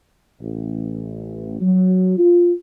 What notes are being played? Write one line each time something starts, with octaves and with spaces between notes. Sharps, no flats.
A1
F#3
F4